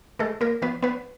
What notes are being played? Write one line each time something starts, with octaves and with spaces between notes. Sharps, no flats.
G#3 A3 A4
A#3 A#4
F3 B3 B4
B3 B4